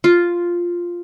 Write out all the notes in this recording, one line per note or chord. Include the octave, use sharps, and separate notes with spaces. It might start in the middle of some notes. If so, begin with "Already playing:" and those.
F4